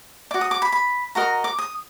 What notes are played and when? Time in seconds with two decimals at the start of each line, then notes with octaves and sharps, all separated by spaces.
0.31 D5 D6
0.34 F#4
0.41 D#6
0.51 D6
0.62 B5
0.72 B5
1.15 F#4 A#4 D#5 A#5
1.44 D6
1.59 D#6